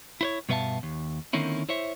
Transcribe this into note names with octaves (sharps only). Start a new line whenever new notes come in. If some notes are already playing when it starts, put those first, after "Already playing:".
E4 C5 C#5
G2 B2 B3 E5 F5 A5
D#2
D3 D#3 A#3 C4 C#4 E4
E4 C5 C#5 E5